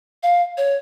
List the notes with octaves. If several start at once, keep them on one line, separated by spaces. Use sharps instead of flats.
F5
C#5